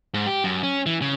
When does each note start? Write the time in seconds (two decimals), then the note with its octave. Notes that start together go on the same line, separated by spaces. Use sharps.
0.14 G#2
0.26 G4
0.44 F#2
0.63 C#4
0.86 E3
1.02 C#3